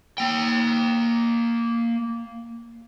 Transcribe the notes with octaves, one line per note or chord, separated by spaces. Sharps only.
A#3 G5